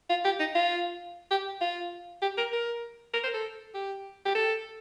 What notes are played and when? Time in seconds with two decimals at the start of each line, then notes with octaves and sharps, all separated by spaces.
0.09 F4
0.25 G4
0.39 D#4
0.55 F4
1.31 G4
1.61 F4
2.22 G4
2.38 A#4
2.53 A#4
3.13 A#4
3.24 C5
3.34 A4
3.74 G4
4.25 G4
4.35 A4